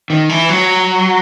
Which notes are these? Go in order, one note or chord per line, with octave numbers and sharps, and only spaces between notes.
D#3
E3
F#3